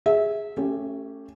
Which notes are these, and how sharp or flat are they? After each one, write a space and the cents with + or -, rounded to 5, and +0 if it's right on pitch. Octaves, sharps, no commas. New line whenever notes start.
G#4 +0 E5 -20
A3 +25 C#4 +0 G4 +0